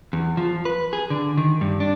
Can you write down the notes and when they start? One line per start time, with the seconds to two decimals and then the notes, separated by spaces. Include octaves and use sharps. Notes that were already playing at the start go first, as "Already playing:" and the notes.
0.13 E2
0.37 F3
0.65 B4
0.93 G#4
1.10 D3
1.37 D#3
1.61 G2
1.80 D4